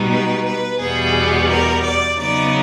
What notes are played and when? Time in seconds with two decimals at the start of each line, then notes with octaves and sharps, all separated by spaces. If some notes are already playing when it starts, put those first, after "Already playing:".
Already playing: B2 G3 B3 D#4
0.10 B4
0.46 B4
0.79 E2 B2 G3 B3 G#4
1.49 A#4
1.84 D5
2.19 C#3 F#3 B3 D#4 D5